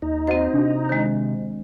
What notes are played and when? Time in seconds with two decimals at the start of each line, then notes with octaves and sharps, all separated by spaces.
0.02 D#2 D#4
0.27 C4 F#4 C5 D#5 F#5
0.53 C3 D4 F#4
0.89 D#3 G#3 C5 D#5